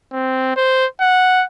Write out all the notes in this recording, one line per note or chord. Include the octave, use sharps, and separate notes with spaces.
C4
C5
F#5